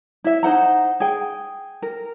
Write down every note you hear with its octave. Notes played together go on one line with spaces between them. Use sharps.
E4 E5
D#4 C5 F#5 A#5
G#4 G5
A#4